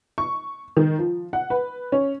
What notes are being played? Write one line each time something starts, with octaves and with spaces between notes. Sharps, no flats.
C#6
D#3
F3
F#5
B4
C#4